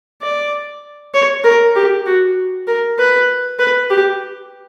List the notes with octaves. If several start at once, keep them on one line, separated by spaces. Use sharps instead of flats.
D5
C#5
A#4
G4
F#4
A#4
B4
B4
G4